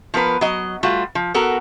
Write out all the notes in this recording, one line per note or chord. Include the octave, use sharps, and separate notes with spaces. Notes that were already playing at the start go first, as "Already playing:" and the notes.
F3 B3 A#4 B4
F#3 D#5
G3 A3 F4 F#4
F3
B3 F#4 A4 A#4